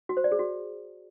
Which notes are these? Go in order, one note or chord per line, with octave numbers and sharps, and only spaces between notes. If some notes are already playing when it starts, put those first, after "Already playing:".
F#4
C5
D5
G#4
F#4